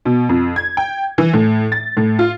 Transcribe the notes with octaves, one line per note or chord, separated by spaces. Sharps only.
B2
F2
G#6
G5
E3
A2
A6
A2
F4